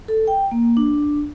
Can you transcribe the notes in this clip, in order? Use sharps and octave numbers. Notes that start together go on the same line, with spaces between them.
A4
G5
A#3
D4